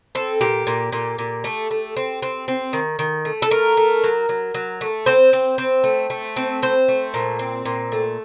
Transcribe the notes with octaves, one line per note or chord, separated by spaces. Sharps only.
C4 A4
A#2 G4
A#2
A#2
A#2
A3
A3
C4
C4
C4
D#3
D#3
A3
A4
A3 A#4
A3
F#3
F#3
F#3
A3
C4 C5
C4
C4
A3
A3
C4
C4 C5
A3
A#2
C4
A#2
A3